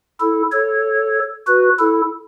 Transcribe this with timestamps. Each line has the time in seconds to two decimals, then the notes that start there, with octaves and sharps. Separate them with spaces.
0.20 E4 A4
0.52 A4 C#5
1.47 F#4 B4
1.79 E4 A4